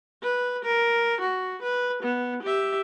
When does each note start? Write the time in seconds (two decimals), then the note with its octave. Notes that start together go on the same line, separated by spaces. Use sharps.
0.22 B4
0.65 A#4
1.21 F#4
1.62 B4
2.03 B3
2.43 G4 E5